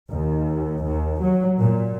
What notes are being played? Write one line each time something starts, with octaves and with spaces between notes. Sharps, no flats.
D#2
D#2
F#3
A#2